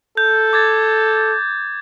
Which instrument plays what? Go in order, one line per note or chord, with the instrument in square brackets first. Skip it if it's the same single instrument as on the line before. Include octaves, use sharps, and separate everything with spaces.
[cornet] A4 [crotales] G6
[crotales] D6 G#6 A6